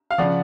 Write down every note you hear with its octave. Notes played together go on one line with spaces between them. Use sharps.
F5
C#3 F3 D5 F#5